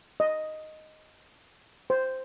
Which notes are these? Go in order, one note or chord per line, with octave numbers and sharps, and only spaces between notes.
D#5
C5